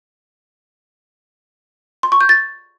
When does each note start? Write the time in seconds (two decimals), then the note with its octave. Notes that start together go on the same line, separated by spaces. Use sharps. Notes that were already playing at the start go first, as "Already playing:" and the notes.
2.03 C6
2.12 C#6
2.21 G6
2.29 A6